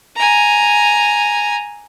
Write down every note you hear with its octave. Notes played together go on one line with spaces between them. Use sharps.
G#5 A#5